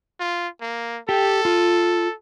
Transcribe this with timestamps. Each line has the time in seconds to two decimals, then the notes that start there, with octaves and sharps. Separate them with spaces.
0.20 F4
0.61 A#3
1.09 G4 A4 G5
1.45 F4